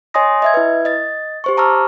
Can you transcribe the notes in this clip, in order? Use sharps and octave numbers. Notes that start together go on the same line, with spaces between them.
C#5 D#5 G#5 C6 D#6 A#6
D#5 E5 G#6
E4 B4
D#5 A6
G4 C5 C#6
A5 A#5 C#6 D6 E6 F6